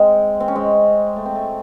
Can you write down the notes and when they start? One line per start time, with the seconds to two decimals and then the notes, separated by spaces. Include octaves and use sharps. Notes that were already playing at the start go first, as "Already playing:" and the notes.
Already playing: G#3 C4
0.40 C4
0.48 C#4
0.56 G#3 C4
1.16 A3
1.26 C4
1.35 A3